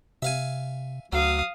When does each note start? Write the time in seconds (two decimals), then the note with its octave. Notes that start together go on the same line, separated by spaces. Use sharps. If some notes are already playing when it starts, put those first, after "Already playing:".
0.22 C3 E5 F5 G#5
1.13 D2 F#3 F5 D#6